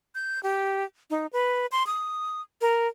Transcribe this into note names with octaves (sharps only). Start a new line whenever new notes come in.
G6
G4
D#4
B4
C6
D#6
A#4